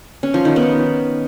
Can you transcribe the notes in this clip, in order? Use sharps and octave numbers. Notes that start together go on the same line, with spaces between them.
C#4
F3
D#3
B3